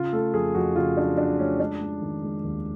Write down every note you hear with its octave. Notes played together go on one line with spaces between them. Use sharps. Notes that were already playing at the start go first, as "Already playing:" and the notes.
Already playing: C#3 F4
A3 A4
F2 G#4
F2 F#4
C#3 F4
F#3 D4
F#3 D4
A3 C#4
G#3 D4
G#3
D#3
G#3
D#2